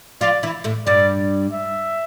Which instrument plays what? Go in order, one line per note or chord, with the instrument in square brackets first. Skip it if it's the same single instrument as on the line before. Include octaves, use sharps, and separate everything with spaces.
[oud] F3 F4 [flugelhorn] D5
[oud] E3 E4
A2 A3
[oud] G2 G3 [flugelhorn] D5
[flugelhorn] E5